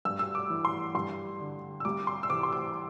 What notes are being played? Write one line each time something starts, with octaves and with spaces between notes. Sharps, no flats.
G2 E6
E6
D6
E3
C6
G2 C6
D3
E6
C2 D6
C6
E6
C3 E3 D6
C6
D6